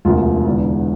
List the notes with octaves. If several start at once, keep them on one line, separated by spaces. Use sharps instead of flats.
E1 D2 C3 F3 A#3 F4
E1 E2 D3